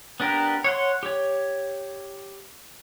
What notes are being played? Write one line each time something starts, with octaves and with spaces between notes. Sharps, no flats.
B3 D4 G4 A#4 B4
C#5 F#5 C6
G4 C#5